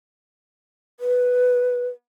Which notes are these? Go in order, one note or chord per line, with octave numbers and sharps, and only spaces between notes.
B4